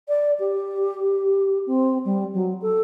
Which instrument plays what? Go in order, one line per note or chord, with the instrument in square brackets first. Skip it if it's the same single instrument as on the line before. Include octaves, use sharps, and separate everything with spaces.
[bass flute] D5
G4
C4
G3
F#3
A4